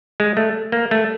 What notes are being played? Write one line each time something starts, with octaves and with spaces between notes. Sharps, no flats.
G#3
A3
A#3
A3